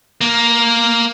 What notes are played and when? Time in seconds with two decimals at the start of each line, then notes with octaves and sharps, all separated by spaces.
0.21 A#3